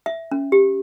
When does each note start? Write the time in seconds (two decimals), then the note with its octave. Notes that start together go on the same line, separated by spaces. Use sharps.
0.06 E5
0.31 C#4
0.52 G4